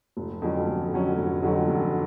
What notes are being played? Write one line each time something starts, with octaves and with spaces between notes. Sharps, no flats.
F1
F2 D3 F#3 C#4
F1
F2 D3 F#3 C#4
F1
F2 D3 F#3 C#4
F1